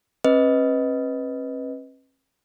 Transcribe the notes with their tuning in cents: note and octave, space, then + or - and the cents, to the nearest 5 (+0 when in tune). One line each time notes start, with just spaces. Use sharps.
C#4 -45 B4 +0 D#5 +15